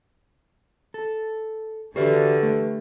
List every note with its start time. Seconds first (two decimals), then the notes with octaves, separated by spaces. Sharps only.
0.94 A4
1.96 D3 F#4 G4 B4 D5 E5
2.43 A3